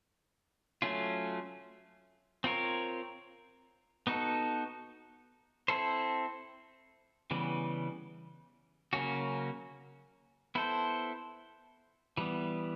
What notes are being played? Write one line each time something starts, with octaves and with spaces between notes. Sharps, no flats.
F#3 A3 C#4 F4
C4 F4 A#4 C#5
B3 D#4 F#4 A4
C4 E4 A4 C5
C#3 E3 G3 B3
C#3 F#3 A#3 C#4 F#4
B3 E4 A4 C5
E3 G3 B3